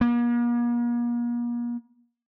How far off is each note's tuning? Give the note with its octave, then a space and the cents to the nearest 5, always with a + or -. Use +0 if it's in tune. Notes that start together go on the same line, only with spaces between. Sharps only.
A#3 +40